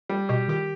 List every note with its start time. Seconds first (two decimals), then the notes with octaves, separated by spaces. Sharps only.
0.09 G3
0.29 B2 G4
0.48 D#3 G4